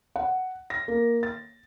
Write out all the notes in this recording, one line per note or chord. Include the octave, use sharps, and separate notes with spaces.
F#5
A#6
A#3
A6